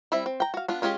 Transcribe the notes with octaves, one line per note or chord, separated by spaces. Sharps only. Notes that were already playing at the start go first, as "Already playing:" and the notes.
G3 C4 E4 E5
C4
G5 A#5
F#4 F5
B3 D4 F4
G#3 C#4 F4 G4 G#4